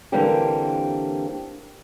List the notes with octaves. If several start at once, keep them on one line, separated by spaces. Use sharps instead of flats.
D3 E3 G3 A#3 C4 G4